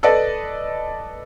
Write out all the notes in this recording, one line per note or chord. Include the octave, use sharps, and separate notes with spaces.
A4 B4 D5 D#5